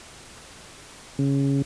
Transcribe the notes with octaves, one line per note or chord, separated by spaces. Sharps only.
C#3